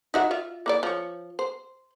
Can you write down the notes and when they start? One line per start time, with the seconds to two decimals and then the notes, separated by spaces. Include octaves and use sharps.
0.14 D#4 F#4 E5
0.31 F4 E5
0.66 A#3 E4 D5
0.83 F3 C#5
1.39 C5